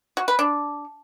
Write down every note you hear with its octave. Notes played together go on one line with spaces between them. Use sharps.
F#4
B4
D4